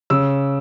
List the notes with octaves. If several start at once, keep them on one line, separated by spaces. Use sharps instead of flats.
C#3 E6